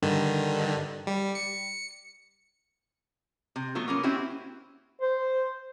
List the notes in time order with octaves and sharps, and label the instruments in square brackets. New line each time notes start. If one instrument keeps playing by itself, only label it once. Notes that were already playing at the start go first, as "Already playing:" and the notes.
[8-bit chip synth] G2 D3 D#3
G3
C#7
[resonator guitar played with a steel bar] C3
F#3 A3 B3 F4
A#3 B3 C#4
C4 C#4 E4 F#4 G4
[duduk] C5